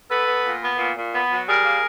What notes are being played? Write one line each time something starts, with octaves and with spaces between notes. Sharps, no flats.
B3 A4 B4
B3
A#2
B3
A#2
A#2
B3
F#3
G3 G#4 A#4
A#3